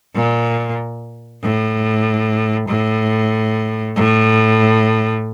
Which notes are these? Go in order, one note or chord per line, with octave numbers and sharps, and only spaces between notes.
A#2
A2
A2
A2